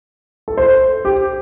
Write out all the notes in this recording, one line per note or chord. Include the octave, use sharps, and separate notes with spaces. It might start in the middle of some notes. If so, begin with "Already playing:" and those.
A4
C5
G4